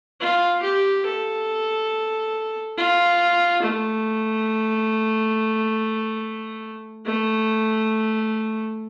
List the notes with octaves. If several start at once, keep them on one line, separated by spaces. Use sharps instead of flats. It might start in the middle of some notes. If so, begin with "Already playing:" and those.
F4
G4
A4
F4
A3
A3